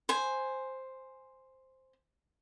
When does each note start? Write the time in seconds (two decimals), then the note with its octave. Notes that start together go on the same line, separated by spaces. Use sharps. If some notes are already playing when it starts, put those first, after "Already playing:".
0.09 C5 G#5